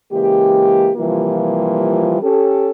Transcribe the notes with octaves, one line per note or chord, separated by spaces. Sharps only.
C#3 E3 G#3 A#3 G4
C3 E3 F3 G3 A#3 F4
C#4 G4 A4